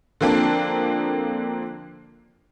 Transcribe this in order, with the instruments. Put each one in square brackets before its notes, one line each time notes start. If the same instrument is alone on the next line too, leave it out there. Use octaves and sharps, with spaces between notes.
[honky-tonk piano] D3 F3 A#3 C4 D4